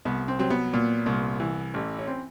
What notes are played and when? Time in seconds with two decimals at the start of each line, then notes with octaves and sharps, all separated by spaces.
0.05 C2 B3
0.28 C4
0.39 F#3 C4
0.50 B3
0.73 A#2
1.06 C2
1.40 E3
1.74 A1
1.99 C#4
2.07 C4